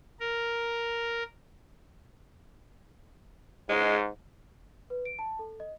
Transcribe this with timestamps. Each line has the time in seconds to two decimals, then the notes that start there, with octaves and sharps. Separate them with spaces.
0.20 A#4
3.69 G#2 G#3
4.90 B4
5.05 D7
5.19 A5
5.39 A4
5.60 D#5